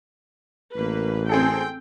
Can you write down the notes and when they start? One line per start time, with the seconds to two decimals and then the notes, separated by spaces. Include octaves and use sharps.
0.76 A1 A#3 B4
1.29 C4 G#4 A4 G5